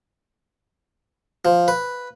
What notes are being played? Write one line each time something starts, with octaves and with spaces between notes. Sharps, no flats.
F3
B4